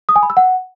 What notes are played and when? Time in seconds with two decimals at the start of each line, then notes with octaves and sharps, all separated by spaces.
0.09 D#6
0.16 G#5
0.23 B5
0.30 E6
0.37 F#5